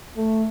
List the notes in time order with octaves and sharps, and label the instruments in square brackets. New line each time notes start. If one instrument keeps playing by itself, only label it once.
[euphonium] A3